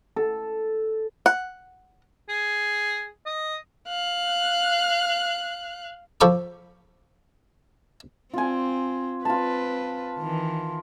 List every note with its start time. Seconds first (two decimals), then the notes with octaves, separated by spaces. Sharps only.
0.16 A4
1.26 F#5
2.29 G#4
3.26 D#5
3.88 F5 F#6
6.21 F3 A4 B5 C#6 D6
8.34 C4 F4 G#5
9.25 C4 F4 B4 A5
10.19 D#3 E3